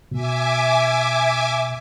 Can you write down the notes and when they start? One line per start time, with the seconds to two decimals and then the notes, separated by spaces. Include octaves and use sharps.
0.12 B2 E5 G#5 D6